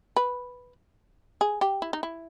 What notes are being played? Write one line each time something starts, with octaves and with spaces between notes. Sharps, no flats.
B4
G#4
G4
E4
D#4
E4